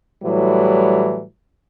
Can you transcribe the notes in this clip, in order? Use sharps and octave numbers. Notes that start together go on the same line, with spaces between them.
A2 E3 F#3 G3